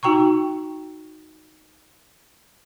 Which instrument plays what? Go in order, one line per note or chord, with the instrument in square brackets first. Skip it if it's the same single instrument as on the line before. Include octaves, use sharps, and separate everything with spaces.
[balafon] D#4 F#4 G5 A#5 C#6